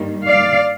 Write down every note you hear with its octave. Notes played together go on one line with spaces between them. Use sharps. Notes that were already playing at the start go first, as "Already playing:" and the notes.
Already playing: G2 D#3 G3 A#3
D5 F5